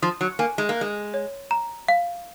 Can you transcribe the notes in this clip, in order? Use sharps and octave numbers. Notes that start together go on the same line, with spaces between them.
F3 D#6
F#3
A#3 G#5
G#3
A#3
G#3 F#6
C#5
A#5
F5